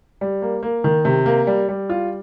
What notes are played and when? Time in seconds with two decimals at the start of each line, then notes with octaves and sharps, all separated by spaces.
0.21 G3
0.42 A#3
0.63 A#3
0.84 D#3
1.05 C3
1.26 A#3
1.47 G3
1.69 G3
1.89 F4